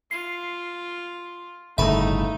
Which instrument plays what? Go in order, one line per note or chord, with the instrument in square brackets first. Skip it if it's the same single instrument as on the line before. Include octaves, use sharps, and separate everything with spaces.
[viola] F4 [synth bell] C7
[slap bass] G1 A2 C#3 [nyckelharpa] A3 [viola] D#4 [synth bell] E5 B5